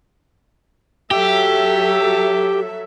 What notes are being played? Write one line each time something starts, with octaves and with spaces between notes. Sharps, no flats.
F#3 G4 A4 E5